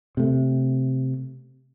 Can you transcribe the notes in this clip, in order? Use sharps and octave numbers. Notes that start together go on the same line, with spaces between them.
C3 A3